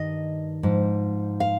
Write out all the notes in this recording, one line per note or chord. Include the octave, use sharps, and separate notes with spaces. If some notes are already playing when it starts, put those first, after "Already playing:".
Already playing: G2 D#3 D#5
G#2 F3
F5